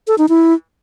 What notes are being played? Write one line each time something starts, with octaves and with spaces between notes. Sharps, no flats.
A4
D#4
E4